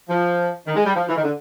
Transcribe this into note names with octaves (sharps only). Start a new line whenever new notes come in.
F3
D#3
G#3
G3
F3
E3
D#3
D3